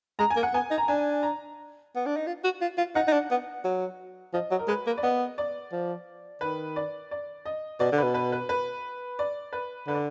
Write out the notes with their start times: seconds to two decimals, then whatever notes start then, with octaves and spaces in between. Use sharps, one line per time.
0.19 G#3 A#5
0.30 G#5
0.36 A#3
0.43 F#5
0.54 B3 G#5
0.71 D#4
0.78 A#5
0.88 D4 G#5
1.23 A#5
1.96 B3
2.06 D4
2.16 D#4
2.27 F4
2.44 F#4
2.61 F4
2.78 F4
2.95 D#4 F#5
3.08 D#4
3.13 D4
3.31 B3
3.64 F#3
4.33 F3 D#5
4.51 F#3
4.59 A#4
4.68 G#3 B4
4.86 A#3
4.97 D5
5.03 B3 D#5
5.38 D5
5.72 F3
6.41 D#3 B4
6.76 D5
7.11 D5
7.46 D#5
7.80 B2 D5
7.92 D3
7.98 B4
8.03 B2
8.14 B4
8.32 B4
8.49 B4
9.19 D5
9.53 B4
9.87 D3 B4
9.95 D5